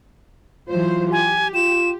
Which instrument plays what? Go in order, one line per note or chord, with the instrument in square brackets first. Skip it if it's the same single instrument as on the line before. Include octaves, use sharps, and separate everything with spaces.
[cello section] E3 F#3 C5 [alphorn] F4
[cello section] G4 [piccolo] G#5
[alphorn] F4 [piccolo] E7